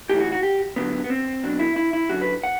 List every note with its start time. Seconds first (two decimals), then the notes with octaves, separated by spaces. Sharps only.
0.09 B1 A2 E3 G4
0.21 F#4
0.32 F#4
0.43 G4
0.76 D2 D3 F#3 B3
1.04 B3
1.10 C4
1.43 B1 B2 F#3 D4
1.59 E4
1.76 E4
1.93 E4
2.10 F#2 D3 F#3 F#4
2.22 B4
2.43 F#5